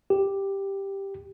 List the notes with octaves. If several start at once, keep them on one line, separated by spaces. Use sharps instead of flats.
G4